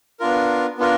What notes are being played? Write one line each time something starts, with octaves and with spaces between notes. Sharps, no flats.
B3 D4 F4 A#4
B3 D4 F4 A#4